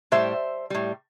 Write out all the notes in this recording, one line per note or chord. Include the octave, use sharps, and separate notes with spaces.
A2 G3 C5 E5
A2 G3